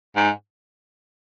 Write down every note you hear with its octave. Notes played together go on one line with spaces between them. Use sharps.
G#2